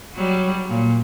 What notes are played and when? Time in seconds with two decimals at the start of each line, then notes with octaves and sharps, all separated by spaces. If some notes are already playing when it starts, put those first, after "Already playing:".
0.15 F#3 G3
0.69 A#2